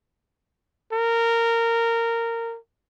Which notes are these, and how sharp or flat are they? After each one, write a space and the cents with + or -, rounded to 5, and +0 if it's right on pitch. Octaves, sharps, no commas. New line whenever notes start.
A#4 -15